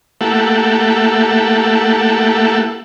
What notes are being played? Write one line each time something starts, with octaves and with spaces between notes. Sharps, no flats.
A3 A#3 E4 G4 A4 F#5